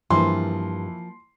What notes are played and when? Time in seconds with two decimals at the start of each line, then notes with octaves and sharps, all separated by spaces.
0.10 G2 E3 F3 A#3 C6